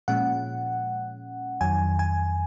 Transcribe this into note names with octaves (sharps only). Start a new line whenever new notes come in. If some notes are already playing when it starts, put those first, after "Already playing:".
A#2 F3 G#3 C#4 F#5
F2 D#3 F#3 G#5
G#5